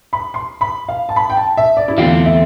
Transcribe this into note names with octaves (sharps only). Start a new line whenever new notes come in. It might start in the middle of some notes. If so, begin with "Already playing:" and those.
B5
C6
B5
F5
A5
B5
G5
A5
E5
D5
E4
E2 D3 A3 C4 F4
E5